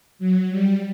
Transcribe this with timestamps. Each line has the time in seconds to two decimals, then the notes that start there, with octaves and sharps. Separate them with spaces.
0.19 F#3
0.49 G3